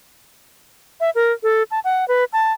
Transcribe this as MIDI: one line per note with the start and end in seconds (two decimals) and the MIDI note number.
1.00 1.10 76
1.15 1.32 70
1.43 1.63 69
1.71 1.80 81
1.84 2.07 78
2.08 2.24 71
2.33 2.52 81